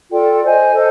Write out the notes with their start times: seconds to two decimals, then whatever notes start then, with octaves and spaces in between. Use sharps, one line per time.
0.12 F4 A4 D5 G5
0.43 C5 D#5 G#5
0.74 A4 C5 D#5